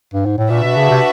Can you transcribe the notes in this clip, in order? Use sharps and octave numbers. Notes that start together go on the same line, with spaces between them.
G2
G#2
A2
A#2 D4 F#4 B4 E5 A5
B2
C#3
C3